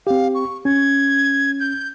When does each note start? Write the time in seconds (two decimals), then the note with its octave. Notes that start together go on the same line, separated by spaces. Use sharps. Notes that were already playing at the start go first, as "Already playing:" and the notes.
0.07 C4 G4 F5
0.35 C#6
0.65 C#4 G#6
1.60 G6